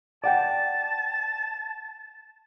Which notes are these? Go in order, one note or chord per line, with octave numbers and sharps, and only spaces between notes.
D5 F#5 G5 A5